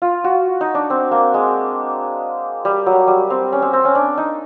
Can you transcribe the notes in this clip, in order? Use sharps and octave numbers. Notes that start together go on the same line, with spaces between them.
F4
F#4
D#4
D4
C4
A#3
G#3
G3
F#3
G3
C4
C#4
C4
C4
C#4
D4
D#4